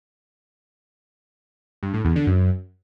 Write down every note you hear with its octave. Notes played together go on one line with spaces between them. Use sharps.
G2
A2
E2
D3
F#2